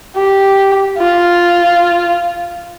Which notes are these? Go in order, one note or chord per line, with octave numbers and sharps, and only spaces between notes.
G4
F4